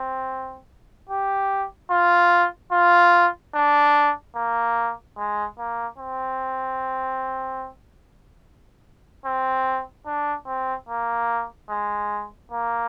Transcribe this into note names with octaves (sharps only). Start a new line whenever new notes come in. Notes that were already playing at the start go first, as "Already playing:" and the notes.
Already playing: C4
G4
F4
F4
D4
A#3
G#3
A#3
C4
C4
D4
C4
A#3
G#3
A#3